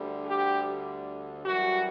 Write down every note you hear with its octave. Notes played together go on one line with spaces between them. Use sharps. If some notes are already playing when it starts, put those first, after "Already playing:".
Already playing: D2 D3 G3
G4
F#2 E3 G3 F#4